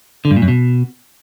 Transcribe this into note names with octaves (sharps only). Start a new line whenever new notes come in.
D3
G2
A#2
F#2
B2